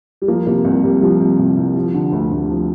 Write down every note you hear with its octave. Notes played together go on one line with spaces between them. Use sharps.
G3
F3 A#3
C3 A#3
C2
C2 G3
F3 G3
C3
C2
C2
F3
D3
D2
D2
F3